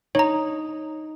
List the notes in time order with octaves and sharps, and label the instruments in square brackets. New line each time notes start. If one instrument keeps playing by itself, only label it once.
[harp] D#4 [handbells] C#5 A#5